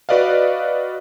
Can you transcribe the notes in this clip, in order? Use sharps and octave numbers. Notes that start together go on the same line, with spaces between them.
F#4 B4 D5 D#5 F5